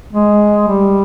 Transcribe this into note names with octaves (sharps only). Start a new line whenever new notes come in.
G#3
G3